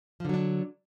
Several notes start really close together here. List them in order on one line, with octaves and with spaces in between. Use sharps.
F3 D3 F#3 D4